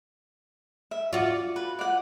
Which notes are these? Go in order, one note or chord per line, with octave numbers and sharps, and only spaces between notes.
E5
F4 F#4 D5
B4
D5 F#5